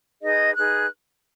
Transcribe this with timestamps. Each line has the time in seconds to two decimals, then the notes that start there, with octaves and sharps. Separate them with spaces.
0.22 D#4 G#4 B4 D#5
0.56 D#4 G#4 B4 F#6